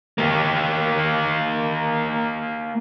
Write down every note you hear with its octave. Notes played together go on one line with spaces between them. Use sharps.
A#3 G4